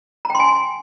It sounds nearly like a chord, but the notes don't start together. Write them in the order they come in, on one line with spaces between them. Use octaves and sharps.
A#5 G5 C6 G#5